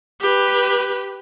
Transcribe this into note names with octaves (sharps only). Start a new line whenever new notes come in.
G4 B4